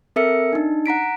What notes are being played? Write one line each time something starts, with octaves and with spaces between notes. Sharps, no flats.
C4 A4 A#4 E5 E6 C#7
D4 D#4
F#5 A#5 B6 D7